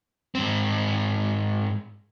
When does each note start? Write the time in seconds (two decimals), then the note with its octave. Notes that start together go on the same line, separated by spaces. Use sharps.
0.35 G#2 C4